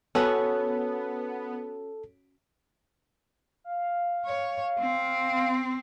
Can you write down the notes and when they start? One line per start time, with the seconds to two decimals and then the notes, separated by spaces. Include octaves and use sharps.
0.15 B3 C#4 F#4 A4
3.64 F5
4.25 C#5
4.79 C4